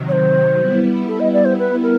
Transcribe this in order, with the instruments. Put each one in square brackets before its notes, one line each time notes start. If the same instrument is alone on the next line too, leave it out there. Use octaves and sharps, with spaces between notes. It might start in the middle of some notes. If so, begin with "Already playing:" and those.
Already playing: [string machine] C3 D#3 F#3
[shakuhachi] C#5
C5
[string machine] G3 B3 E4
[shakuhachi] A4
D#5
D5
C5
B4
A#4